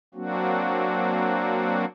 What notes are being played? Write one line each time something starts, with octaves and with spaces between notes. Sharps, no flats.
F#3 A#3 C4 D4 F#4